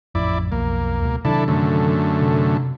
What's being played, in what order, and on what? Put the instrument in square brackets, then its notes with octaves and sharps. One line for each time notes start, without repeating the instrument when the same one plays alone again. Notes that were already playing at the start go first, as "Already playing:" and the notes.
[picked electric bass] A1 F2 [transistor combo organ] E4 D5
[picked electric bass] B1 F2 [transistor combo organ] A#3
[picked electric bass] C#2 B2
[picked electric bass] C3 D#3 F#3 [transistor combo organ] D4 E4 A4
[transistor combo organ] F#2 D3 A3
[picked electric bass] C3